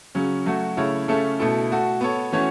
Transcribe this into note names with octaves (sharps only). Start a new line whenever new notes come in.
C#3 F#3 C#4
F#3 A3 F#4
C#3 A3 E4 C#5
C#3 A3 C#4 A4 E5
B2 A3 E4 A4
A3 F#4 A4
B3 A4 C#5
E3 A3 C#4 F#4 C#5